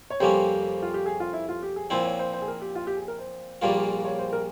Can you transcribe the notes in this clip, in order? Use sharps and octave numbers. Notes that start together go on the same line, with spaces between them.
C#5
F2 C3 G3 A#3 C#4 C5
F4
G4
G#4
F4
E4
F4
G4
G#4
A#2 F3 C4 E4 C5
C#5
C5
C5
G#4
A#4
G4
F4
G4
G#4
A#4
C5
A#1 A#2 G3 A#3 F4
C#5
C5
A#4